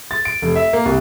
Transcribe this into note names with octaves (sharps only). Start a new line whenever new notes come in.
A6
D7
F1
E5
A#3
C2